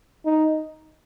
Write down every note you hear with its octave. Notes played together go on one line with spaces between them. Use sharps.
D#4